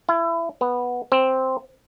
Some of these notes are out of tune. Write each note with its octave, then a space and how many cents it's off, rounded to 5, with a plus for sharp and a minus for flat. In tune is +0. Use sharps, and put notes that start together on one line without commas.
E4 +25
B3 -5
C4 +0